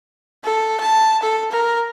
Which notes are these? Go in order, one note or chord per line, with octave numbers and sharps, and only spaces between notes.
A4
A5
A4
A#4